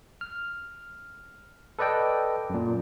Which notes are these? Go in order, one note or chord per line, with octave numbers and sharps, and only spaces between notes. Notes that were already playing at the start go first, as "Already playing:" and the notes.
F6
A4 B4 D5 D#5 G5
F#2 A#2